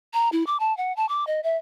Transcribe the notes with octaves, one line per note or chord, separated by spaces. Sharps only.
A#5
E4
D6
A5
F#5
A5
D6
D#5
E5